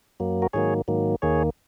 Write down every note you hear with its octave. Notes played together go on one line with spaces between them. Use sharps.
F#2 F#3 A#3
F#4 A#4
G#2 D#3 F#3 A#3 G#4 C#5
G#2 D#3 F#3 A#3
D#2 D#3 A#3 G#4 C#5